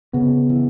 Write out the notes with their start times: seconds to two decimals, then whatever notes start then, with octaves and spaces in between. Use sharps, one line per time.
0.13 C#3 B3
0.50 E3